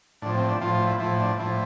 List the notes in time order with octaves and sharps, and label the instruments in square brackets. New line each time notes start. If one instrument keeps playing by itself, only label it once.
[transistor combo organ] A2 F3 D4
C4
D4
A2 F3 F4
F4
E4
A2 F3 E4
D4
A2 F3 E4